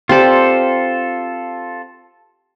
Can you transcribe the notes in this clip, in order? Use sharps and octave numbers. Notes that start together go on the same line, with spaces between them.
C4 F4 G4 A4 D5